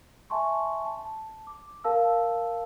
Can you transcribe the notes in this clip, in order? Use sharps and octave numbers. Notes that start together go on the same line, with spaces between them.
E5 G#5 A5 C6 C#6
A5
D6
A#4 F5 A5 E6